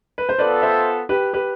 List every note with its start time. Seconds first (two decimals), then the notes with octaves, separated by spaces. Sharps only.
0.18 B4
0.29 C5
0.38 B3 F4 A4 B4 D5
0.62 C5 E5
1.09 G4 B4
1.33 G4 B4